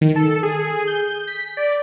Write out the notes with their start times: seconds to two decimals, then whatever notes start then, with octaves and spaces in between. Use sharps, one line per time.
0.01 D#3
0.16 A4
0.43 G#4
0.88 G6
1.28 B6
1.57 D5